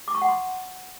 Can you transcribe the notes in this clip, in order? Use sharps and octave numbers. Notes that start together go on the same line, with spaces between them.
D6
C#6
F#5
C6